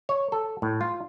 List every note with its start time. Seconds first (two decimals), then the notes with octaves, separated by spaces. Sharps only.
0.09 C#5
0.32 A4
0.62 A2
0.81 F4